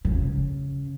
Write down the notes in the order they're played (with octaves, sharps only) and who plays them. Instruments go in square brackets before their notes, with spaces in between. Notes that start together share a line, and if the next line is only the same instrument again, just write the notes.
[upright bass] C#3